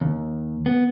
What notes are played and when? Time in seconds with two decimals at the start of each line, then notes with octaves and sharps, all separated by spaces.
0.01 D#2
0.66 B3